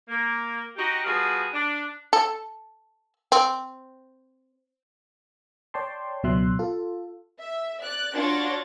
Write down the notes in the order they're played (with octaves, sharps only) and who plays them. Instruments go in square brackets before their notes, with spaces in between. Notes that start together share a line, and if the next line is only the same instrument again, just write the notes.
[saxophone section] A#3
D#4 F#4 G4
F3 G3 B3 F#4 G#4 F5
D4
[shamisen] A4
C4
[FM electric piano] C#5 D5 G5 A5 C6
C#2 B2 F#3 E5 C6 F#6
F4 A4
[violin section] E5
D5 F#6
D4 F4 F#4 C#5 A6 A#6